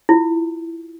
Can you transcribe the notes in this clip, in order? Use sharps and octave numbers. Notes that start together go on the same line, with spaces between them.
E4 F4